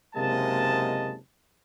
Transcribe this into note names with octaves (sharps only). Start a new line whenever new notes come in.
F#1 C3 G#3 A#3 D#5 A5